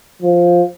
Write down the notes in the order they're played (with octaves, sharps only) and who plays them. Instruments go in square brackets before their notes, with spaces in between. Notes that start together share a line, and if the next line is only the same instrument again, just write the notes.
[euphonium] F3